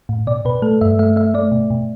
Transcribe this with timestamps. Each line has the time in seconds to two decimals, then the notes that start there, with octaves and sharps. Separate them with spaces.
0.09 A2
0.27 B2 D5
0.45 B2 B4
0.62 A3 A4
0.81 G2 E5
0.99 A3 E5
1.16 A3 E5
1.34 A3 D5
1.52 B2
1.70 B2